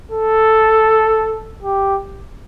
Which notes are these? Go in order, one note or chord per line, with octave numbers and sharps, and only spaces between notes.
A4
G4